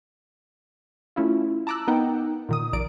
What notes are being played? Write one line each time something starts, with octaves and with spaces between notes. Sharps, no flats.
A3 C#4 E4 F4
A5 A#5 D6 E6 F#6
B3 D#4 A#4 F#5 G5
A#2 D#3 D#6
A#1 A#4 D5 D7